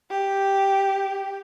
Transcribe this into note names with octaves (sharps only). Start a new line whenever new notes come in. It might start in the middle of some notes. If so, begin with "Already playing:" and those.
G4